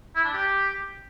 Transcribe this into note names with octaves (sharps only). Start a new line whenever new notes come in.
E4
D4
G4